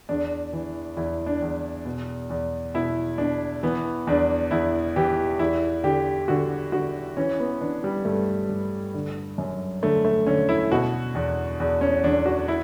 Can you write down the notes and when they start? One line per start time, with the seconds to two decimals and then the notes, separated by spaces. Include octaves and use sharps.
0.09 E2 D4
0.53 E3
0.97 E2 E4
1.26 D4
1.42 E2
1.85 B2
2.30 E2
2.74 B2 E4
3.18 B2 D4
3.63 E3 B3
4.07 E2 D4
4.51 E2 E4
4.96 E3 G4
5.39 E2 E4
5.84 D3 G4
6.28 D3 F#4
6.72 D3 F#4
7.17 E3 C#4
7.40 B3
7.61 E3 D4
7.84 G3
8.05 G2 A3
8.49 G2
8.94 D3
9.38 F#2
9.83 D3 A3
10.05 A3
10.27 D3 C#4
10.49 E4
10.72 B2 F#4
11.15 E2
11.60 E2
11.81 C#4
12.04 E2 D4
12.26 F#4
12.48 E4